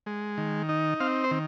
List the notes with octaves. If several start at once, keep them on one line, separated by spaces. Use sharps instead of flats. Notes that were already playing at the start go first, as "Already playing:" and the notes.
G#3
D#3
D#4
C4 F5
C5
D#3